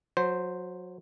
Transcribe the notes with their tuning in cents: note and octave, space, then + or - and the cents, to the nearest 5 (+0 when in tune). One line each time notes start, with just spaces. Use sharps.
F#3 -25 C5 +0